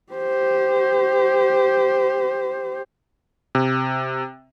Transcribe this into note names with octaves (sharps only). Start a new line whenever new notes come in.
G4 C5
C3